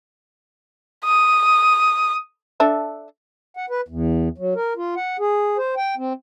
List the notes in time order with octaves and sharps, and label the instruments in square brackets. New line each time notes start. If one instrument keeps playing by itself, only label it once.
[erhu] D#6
[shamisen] D4 A4 E5
[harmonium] F#5
B4
E2
F#3
A#4
F4
F#5
G#4
C5
G5
C4